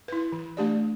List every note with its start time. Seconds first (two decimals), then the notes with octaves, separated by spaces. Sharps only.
0.08 E4 B4
0.32 E3
0.57 A3 D4 G4 D5